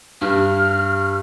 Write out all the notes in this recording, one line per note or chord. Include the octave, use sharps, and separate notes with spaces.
G2 F6